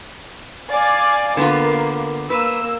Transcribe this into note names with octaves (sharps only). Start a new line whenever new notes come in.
D5 F5 G#5
D3 A#3 B3 F4
A#3 B4 E6